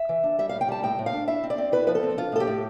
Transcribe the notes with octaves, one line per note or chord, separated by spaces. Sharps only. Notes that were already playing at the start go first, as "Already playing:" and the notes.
Already playing: E5
E3
D4
G3 E5
A2 F5
G5
G3 A5
A2 G5
A2
F5
D4
E4 E5
C4
D5
C4
E4 B4
F3 B4
A4
C4
D4 F4
A2 A4
G4
A2